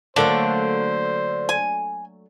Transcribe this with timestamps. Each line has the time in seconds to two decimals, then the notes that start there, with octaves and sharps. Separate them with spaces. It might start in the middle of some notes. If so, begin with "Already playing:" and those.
0.16 D3 F#3 A3 A#3 D4 C5
1.49 G#5